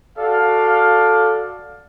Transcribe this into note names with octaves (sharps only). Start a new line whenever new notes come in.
F#4 A4 D5 F5